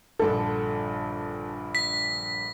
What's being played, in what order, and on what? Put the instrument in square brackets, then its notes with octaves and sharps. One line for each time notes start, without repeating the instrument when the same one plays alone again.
[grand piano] A#1 G2 D3 [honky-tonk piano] A4
[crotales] B6